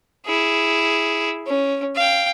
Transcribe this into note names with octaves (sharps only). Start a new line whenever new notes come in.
E4 G#4
C#4
F5 G5